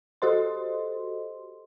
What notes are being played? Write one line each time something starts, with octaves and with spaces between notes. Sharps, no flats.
F#4 G4 A4 C5 D#5 C6